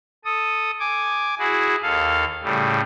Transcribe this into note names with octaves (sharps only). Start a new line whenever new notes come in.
A4 D#6
G#5 D6
E4 F#4 G#4
D#2 A4 F5
A2 C#3 G3